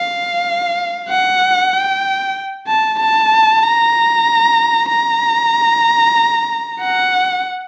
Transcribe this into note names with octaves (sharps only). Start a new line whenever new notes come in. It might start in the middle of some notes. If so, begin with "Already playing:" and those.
Already playing: F5
F#5
G5
A5
A5
A#5
A#5
F#5